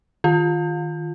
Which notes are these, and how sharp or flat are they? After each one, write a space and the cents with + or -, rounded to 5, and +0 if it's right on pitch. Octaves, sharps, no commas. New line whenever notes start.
D#3 +0 F4 +0